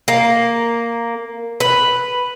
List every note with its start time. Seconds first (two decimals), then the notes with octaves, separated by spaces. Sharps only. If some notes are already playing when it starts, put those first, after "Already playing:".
0.08 A#3
1.60 B4